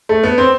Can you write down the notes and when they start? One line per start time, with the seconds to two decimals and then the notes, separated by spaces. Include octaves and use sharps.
0.09 A3
0.23 B3
0.38 C4